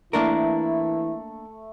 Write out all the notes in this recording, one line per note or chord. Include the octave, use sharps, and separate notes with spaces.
E3 A3 A#3 D4 E4 A#4